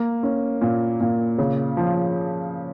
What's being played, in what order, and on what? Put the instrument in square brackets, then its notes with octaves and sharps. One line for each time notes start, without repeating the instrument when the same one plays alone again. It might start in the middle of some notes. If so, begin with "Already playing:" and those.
Already playing: [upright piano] A#3
C#4
A#2
A#2
C#3
F3